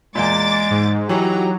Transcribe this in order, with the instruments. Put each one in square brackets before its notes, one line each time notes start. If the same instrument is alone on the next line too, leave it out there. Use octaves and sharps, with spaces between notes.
[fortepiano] E2 A#2 [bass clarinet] G#3 [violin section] D6 A6
[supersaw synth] G#2
[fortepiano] E3 [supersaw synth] F#3 [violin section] D#4 A#5 [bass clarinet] G4